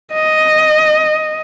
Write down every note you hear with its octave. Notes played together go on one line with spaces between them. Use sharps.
D#5